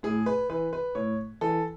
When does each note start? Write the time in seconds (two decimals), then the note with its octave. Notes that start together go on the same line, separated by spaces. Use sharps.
0.03 A2 G#4
0.26 B4
0.50 E3 B4
0.73 B4
0.95 A2 C#5
1.41 E3 A4